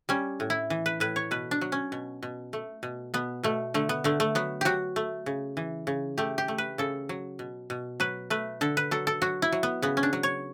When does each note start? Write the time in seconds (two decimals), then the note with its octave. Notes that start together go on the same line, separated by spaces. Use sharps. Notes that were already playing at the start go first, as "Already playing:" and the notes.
0.09 G3 C#4
0.40 A2
0.50 E4
0.70 E3
0.86 B4
1.00 A2 B4
1.16 C#5
1.31 B2 B4
1.51 D4
1.61 F#3
1.72 C#4
1.92 B2
2.23 B2
2.53 A3
2.83 B2
3.14 B2 B3
3.43 B2 A3
3.74 D3 A3
3.89 B3
4.04 D3 A3
4.20 A3
4.35 F#3 B3
4.61 F#3 F#4 G4
4.96 A3
5.26 C#3
5.57 E3
5.87 C#3
6.18 A3 G4
6.38 G4
6.48 A3
6.58 B4
6.78 C#3 A4
7.09 F#3
7.39 B2
7.70 B2
8.00 F#3 B4
8.30 A3 B4
8.61 D3 A4
8.77 B4
8.91 F#3 A4
9.07 A4
9.22 F#3 F#4
9.42 E4
9.52 F#3
9.63 B3
9.82 C#3 B3
9.97 C#4
10.03 D4
10.13 F#3
10.23 C#5